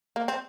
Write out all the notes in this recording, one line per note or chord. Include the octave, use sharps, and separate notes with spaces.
A#3
C4